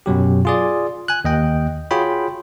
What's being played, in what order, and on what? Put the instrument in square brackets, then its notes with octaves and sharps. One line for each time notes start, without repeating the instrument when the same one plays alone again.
[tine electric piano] F#2 B2 F#3 G4
F4 G#4 D5
G#5 F#6
D#2 D#5 G5
F4 F#4 G#4 C#5 G5 B5